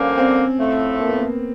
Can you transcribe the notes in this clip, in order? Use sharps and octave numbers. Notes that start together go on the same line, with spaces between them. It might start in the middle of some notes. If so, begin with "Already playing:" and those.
Already playing: G2 D3 F3 A#3 C#4
C4
A2 F3 A3
A#3
B3
A#3